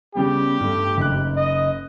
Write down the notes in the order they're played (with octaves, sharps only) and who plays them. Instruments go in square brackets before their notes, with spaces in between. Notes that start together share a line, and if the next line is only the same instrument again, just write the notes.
[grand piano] C#3 G3 B3 [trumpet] G4
[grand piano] G2 G3 A3
F#1 D#4 F#6
[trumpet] D#5